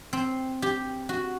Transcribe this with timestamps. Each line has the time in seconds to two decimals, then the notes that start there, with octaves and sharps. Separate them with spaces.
0.13 C4
0.62 G4
1.09 F#4